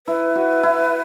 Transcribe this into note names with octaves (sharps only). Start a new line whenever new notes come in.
E4 B4
F#4
E4